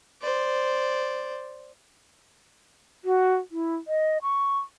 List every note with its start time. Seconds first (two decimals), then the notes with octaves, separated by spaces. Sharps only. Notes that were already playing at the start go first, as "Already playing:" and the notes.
0.22 C5 D5
3.05 F#4
3.51 E4
3.88 D#5
4.22 C#6